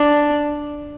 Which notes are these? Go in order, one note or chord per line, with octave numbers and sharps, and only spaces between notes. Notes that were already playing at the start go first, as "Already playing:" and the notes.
Already playing: D4